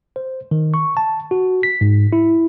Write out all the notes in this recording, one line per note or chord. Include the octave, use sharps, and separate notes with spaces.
C5
D#3
C#6
A5
F#4
B6
G#2
E4